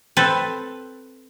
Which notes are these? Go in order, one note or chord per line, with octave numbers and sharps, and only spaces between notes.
C4 A4 B4